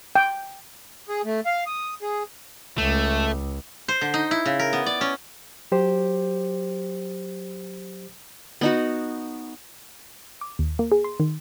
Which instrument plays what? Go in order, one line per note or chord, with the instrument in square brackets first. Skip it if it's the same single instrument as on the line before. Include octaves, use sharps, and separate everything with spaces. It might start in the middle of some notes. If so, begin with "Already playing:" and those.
[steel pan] G5
[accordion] G#4
A3
F5
D#6
G#4
[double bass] C#2 [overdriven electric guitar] A3
[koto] C5
D3
D#4
E4
C#3
A#4
B3
D5
C#4
[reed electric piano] F#3 G4 C5
[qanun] B3 D#4 F#4
[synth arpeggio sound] D6
D#2
A#3
G#4
C6
D#3